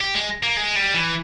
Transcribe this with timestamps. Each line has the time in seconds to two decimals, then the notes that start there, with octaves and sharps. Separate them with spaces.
0.01 G4
0.15 G#3
0.43 A#3
0.57 G#3
0.76 G3
0.94 E3